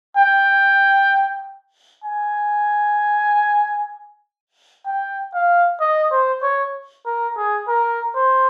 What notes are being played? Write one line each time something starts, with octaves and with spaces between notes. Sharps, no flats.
G5
G#5
G5
F5
D#5
C5
C#5
A#4
G#4
A#4
C5